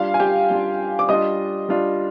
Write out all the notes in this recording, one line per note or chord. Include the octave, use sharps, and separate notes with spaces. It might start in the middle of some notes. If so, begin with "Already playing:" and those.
Already playing: G3 D4 F4 F5
G#5
G4 G5
G3 D4 F4
D6
G3 D4 F4 D#5 D#6
G3 D4 F4